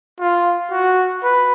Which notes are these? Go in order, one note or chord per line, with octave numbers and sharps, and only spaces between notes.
F4
F#4
B4